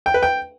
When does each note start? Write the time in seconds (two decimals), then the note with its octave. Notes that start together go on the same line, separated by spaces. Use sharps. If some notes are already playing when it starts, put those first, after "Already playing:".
0.06 G5
0.14 B4
0.23 G5